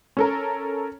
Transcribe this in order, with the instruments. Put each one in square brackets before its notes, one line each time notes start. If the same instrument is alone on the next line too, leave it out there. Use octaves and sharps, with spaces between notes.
[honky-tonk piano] C#4 A4 A#4